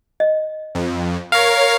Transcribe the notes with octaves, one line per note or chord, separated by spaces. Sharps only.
D#5
F2
A#4 C#5 F5